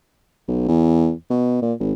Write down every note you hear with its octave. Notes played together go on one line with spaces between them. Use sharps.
B1
E2
B2
A#2
G#1